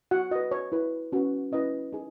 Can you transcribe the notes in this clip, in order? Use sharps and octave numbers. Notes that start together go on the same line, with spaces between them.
F#4 F#5
F#4 B4 D#5
C#5
E4 B4
C#4 F#4 B4
C#4 E4 B4 D#5
D#4 G#4